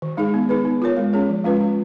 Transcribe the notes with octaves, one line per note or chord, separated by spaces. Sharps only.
D#3
G#3 D#4 G#4
B3
D#4 G#4 B4
B3
F4 A#4 C#5
G#3
C#4 G#4 C#5
F3
G#3 C#4 F4 B4
C#4